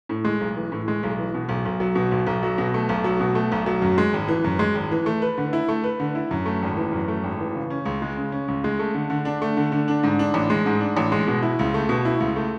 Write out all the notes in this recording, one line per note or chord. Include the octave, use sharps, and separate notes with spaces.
A2
G#3
B1
E3
A2
G#3
B1
E3
B2
B1
B1
F#3
B2
B1
B1
F#3
B2
A3
B1
F#3
B2
A3
B1
F#3
F#2
G#3
G#1
E3
F#2
G#3
G#1
E3
A3
B4
D3
E4
A3
B4
D3
E4
F#2
A3
G#1
E3
F#2
A3
G#1
E3
C#3
C#4
C#2
G#3
C#3
C#4
C#2
G#3
A3
D3
D3
D4
A3
D3
D3
D4
G#2
D4
A1
G#3
G#2
D4
A1
G#3
B2
E4
C#2
A3
B2
E4
C#2
A3